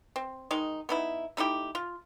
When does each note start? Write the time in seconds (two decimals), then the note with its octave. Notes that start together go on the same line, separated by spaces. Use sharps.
0.16 C4
0.51 D#3 G#3 D#4
0.89 B3 D#4 E4
1.37 A3 D#4 E4 G4
1.75 F4